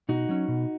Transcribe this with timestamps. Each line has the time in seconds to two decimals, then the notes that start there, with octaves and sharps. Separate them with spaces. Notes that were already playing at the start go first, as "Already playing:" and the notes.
0.09 B2 D#4 F#4
0.29 F#3 C#4
0.48 B2